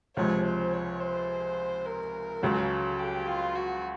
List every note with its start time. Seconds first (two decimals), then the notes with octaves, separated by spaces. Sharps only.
0.16 C#2 C3 F3 G#3 C#5
0.45 C5
0.73 C#5
1.00 C5
1.86 A#4
2.42 C#2 C#3 F#3 A4
2.99 G4
3.27 F4
3.55 F#4